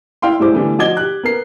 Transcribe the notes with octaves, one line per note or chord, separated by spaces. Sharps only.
E4 F5 G5 C6
A2 G3 G#3 E4 C5 D6
D3 E3 G3 A3 B3
F3 F#4 D#5 D6 G#6 G7
G4 F#6
B3 A#4 C7